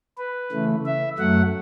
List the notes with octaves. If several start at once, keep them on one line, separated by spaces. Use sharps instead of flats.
B4
C#3 E3 A3
E5
F#2 F#3 A3 F#5